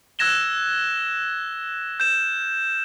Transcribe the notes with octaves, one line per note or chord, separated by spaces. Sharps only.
E6 F#6 G#6 A#6 E7 G7
G6 E7